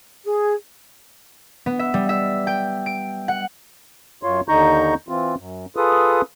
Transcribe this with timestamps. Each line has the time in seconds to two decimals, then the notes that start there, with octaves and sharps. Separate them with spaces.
0.25 G#4
1.66 B3
1.79 E5
1.94 G3
2.09 E5
2.47 G5
2.86 D7
3.28 F#5
4.23 F#2 F4 C#5 C6
4.48 D#2 D3 D#4 A#5 C#6 G6
5.09 E3 C4 F4
5.37 F#2
5.77 F4 G#4 A4 B4 D#6